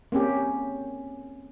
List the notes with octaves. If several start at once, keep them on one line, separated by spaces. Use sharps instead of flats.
A#3 C4 C#4 G4